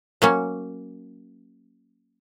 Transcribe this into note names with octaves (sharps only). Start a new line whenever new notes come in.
F#3 A#3 C#4